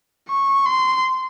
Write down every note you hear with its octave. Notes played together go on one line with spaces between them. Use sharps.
C#6
C6